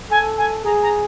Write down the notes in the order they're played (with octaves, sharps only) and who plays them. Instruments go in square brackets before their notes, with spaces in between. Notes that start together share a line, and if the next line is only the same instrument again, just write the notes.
[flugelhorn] A4 [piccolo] G#5
[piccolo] G#5
[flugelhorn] G#4 [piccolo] A#5
[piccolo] A#5